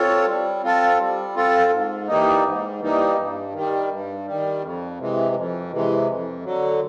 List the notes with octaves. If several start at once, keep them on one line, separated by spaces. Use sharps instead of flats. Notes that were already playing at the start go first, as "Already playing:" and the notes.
Already playing: C4 F4 A4 C#5
G3
C4 F4 A4
G3
C4 F4 A4
G#2
E3 G3 A#3 D#4
G#2
E3 G3 A#3 D#4
G2
D#3 G3
G2
D#3 G3
F2
C3 E3 G#3
F2
C3 E3 G#3
F2
D3 F#3